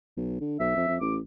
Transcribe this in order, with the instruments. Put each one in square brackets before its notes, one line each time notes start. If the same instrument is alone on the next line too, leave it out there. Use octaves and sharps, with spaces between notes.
[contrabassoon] B1
D3
[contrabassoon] B1 [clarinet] E5
[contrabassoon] F2
F2
[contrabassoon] A1 [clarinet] D6